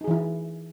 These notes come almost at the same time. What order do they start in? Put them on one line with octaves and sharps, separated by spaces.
D#4 G#4 E3 E4